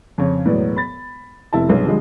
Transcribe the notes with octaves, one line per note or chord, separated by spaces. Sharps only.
F2 C#3 C#5
E1 A2 F#3 B3 D5
B5 A6
F1 E4 A5
B1 G2 G#3 B3
D3 F3 G3 G#3